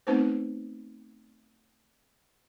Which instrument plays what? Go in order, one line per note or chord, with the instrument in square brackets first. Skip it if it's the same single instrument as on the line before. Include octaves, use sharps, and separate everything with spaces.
[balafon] A3 B3 C4 D#4 B4 C5